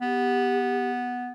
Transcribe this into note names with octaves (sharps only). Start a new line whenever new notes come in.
B3 G4